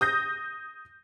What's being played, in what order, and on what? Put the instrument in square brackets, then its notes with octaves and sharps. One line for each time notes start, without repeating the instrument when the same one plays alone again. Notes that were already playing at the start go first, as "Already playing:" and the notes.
[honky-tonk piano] D#6 G6 A#6